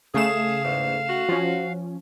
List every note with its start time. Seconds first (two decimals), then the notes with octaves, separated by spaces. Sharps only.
0.14 C#3 A3 G#4 F5 E7
0.64 E2 G#2
1.09 F#4
1.29 F3 C#4